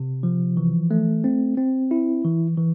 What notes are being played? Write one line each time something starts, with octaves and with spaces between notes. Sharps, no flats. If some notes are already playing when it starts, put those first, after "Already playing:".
Already playing: C3
F3
E3
A3
C4
C4
E4
E3
E3